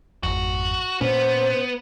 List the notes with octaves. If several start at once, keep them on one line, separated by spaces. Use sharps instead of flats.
G#1 F2 F#4
A#2 B3 C#4 C5